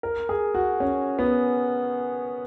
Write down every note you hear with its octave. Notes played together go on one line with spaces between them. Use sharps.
A#4
G#4
F#4
C#4
B3